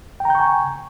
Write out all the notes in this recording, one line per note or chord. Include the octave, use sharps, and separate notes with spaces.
G5 G#5 A#5 C#6 G6